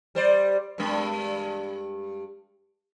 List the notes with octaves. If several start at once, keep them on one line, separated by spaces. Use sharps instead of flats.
G3 C5 D5
G2 G#3